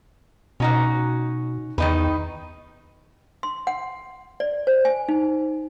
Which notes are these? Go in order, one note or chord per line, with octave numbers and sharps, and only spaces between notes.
B2 C#4 D#4 F#4
E2 D#3 D#4 B4
C6
F#5
D5
C5
G#5
D#4